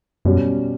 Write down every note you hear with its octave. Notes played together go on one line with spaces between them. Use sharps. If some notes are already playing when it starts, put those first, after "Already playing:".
F#2 B2 G3 C#4